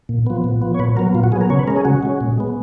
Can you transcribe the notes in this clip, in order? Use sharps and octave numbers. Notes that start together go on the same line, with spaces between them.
A#2
F3 B3
A#2
F3 B3
C#5
A#2 B4
F#3 B3 A#4
A#2 F4
F#4
F#3 B3 G#4
A#4
C#3 C#5
B4
G#3 C#4 A#4
G#4
C#3 F#4
G#3 C#4
A#2
G#3 B3